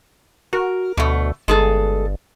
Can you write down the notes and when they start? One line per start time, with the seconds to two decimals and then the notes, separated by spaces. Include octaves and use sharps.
0.53 F#4 A#4
0.97 D2 B2 A3
1.48 G1 G#3 G#4 A4